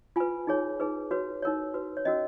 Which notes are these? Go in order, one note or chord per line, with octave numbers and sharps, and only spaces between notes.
F4 B4 G#5
D#4 G#4 C#5
D#4 G#4 B4
F#4 B4 C#5
D#4 A#4 C#5
F#4 B4
C#5
C#4 F#4 A#4 D#5